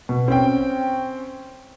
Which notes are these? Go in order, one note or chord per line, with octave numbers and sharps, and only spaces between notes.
B2
C4 C#4 G5